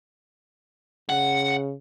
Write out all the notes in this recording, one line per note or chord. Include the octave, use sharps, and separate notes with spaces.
C#3 F#5